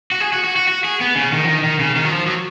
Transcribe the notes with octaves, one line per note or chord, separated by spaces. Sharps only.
F#4
G#4
F#4
F#4
F#4
F#4
G#4
B3
C#3
D#3
F3
D#3
D#3
C#3
D#3
F#3
F3
F#3